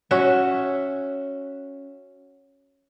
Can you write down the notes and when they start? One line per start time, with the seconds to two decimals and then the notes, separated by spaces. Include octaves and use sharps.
0.11 C#4 F#4 E5